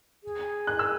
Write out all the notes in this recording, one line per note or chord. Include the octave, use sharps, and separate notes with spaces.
G#4
F#6
E6